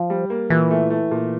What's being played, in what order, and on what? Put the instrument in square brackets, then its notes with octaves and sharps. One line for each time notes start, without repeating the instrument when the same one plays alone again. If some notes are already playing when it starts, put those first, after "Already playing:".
Already playing: [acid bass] F3
[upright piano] G3
A#3
[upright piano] A#2 [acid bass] E3
[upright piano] A3
A3
A#2